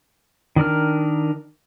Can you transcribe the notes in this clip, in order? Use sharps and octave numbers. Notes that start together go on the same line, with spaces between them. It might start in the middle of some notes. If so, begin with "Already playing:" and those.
D#3 D4 A#4 F6